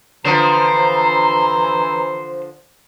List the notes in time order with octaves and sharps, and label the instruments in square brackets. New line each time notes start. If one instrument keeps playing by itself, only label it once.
[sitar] D3 F3 [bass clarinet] E3 [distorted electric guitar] C5 [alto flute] A#5